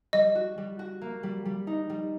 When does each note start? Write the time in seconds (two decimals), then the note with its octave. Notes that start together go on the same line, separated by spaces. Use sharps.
0.13 G3 D#5
0.35 F#4
0.58 G3
0.79 F#4
1.01 A#3
1.23 G3
1.45 G3
1.67 D#4
1.90 G3